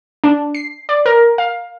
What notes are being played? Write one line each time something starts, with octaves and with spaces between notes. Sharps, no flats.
D4
C7
D5
A#4
F5